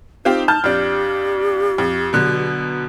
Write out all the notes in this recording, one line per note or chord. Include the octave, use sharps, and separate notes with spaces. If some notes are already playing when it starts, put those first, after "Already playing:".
C4 D#4 F4 G4
A5 F6 G6
F2 D4 G4
F2
B2 D3 F#3